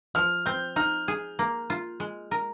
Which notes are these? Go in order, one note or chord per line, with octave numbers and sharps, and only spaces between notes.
F3 F6
C4 G6
D#4 F6
G#4
A#3
F4
G#3
A#4